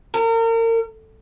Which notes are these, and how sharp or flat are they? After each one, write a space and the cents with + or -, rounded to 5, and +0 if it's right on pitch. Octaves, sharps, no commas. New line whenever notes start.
A#4 -35